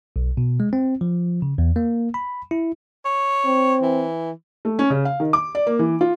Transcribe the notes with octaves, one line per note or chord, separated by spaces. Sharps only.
B1
B2
G#3
C4
F3
C#3
E2
A#3
B5
E4
C#5
C4
E3
A3
C#4
C#3
F5
D#3
D6
D5
A#3
E3
F4